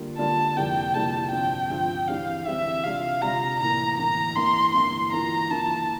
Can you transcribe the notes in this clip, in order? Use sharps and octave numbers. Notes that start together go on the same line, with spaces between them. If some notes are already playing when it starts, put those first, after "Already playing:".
Already playing: D3 G3 A#3 D4 F4
D3 G3 A#3 D4 F4 A5
F2 C3 G3 A#3 E4 G5
F2 C3 G3 A#3 E4 A5
G2 F3 C4 F4 G5
G2 F3 C4 F4
E3 G3 C4 F5
E3 G3 C4 E5
C3 G3 D4 F4 F5
C3 G3 D4 F4 A#5
A2 E3 A#3 A#5
A2 E3 A#3 A#5
G2 E3 A#3 E4 C6
G2 E3 A#3 E4 C6
E3 A#3 F4 A#5
E3 A#3 F4 A5